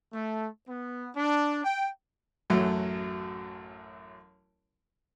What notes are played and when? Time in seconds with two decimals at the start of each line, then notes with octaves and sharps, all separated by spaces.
0.12 A3
0.68 B3
1.16 D4
1.63 G5
2.50 A1 F#2 F#3 A3